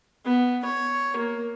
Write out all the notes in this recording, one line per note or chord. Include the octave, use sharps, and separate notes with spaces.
B3
C#5
A#3